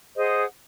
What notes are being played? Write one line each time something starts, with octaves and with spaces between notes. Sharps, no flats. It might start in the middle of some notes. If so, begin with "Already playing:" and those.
G#4 C5 D#5 F#5